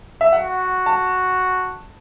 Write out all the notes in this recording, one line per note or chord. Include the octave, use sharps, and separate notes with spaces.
E5
F#4 F#5
A5